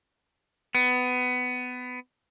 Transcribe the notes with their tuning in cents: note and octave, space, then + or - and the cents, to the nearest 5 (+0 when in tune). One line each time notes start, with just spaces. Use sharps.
B3 +20